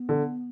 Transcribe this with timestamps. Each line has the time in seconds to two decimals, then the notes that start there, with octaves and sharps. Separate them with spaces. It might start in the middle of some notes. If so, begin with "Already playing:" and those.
Already playing: B3
0.09 D3